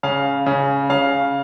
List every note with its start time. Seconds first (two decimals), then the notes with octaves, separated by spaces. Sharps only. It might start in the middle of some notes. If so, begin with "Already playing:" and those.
0.03 C#3 F5
0.46 C#3
0.90 C#3 F5